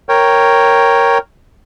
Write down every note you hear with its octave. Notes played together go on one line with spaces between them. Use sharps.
A#4 C#5 G5